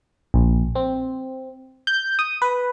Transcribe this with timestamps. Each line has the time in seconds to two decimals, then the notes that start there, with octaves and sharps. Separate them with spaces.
0.34 A#1
0.75 C4
1.87 G6
2.19 D#6
2.42 B4